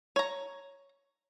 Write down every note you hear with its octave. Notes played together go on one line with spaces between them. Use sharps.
C#5 A#5